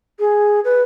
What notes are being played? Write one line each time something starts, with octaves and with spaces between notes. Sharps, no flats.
G#4
B4